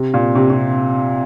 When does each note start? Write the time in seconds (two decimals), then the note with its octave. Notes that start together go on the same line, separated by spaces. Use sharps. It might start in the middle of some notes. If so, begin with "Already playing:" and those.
Already playing: C3
0.14 A#2
0.35 C3
0.50 C3